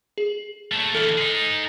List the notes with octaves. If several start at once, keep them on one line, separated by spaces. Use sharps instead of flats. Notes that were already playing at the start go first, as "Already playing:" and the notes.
G#4
A#2 A3
D3 E3 A4 F6
D#4 G#4